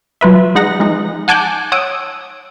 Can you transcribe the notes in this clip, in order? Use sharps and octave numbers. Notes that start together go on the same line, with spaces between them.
F#3 F4 B4 E5
G#3 D#4 F#5 A#6
F3 G#3 D#4
F#5 G#5 A5 D6 F#6 G6
C#5 F#5 D#6 E6 D7